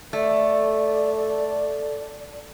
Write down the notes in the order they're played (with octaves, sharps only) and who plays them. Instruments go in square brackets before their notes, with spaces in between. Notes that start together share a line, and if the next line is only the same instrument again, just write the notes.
[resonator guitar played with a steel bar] A3 [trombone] A4 [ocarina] D5